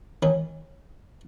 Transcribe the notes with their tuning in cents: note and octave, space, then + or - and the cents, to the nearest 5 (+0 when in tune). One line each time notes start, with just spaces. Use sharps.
D#3 +0 C#4 -20